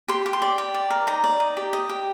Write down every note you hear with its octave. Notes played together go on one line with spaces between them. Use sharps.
G4 C6
G4
C6
D5
G4
D5
A#4
D#4 A#5
D5
D#4
G4
D#5
G4